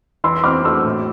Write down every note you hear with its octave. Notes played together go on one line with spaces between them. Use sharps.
E3 C6 E6
C4 D6 F6
A3 C6 E6
A2